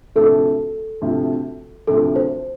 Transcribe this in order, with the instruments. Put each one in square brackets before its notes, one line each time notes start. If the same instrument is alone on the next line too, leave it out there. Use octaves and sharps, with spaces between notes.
[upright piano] D2 C3 F3 A3 [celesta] A4
[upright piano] D2 C3 F3 A3
[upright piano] D2 C3 F3 A3 [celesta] A4
[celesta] C5